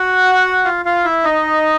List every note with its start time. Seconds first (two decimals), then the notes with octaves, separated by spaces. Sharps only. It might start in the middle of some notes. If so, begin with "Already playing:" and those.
Already playing: F#4 F#5
0.65 F4 F5
0.85 F4 F5
1.05 E4 E5
1.24 D#4 D#5